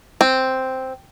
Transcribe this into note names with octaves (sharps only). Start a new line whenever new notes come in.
C4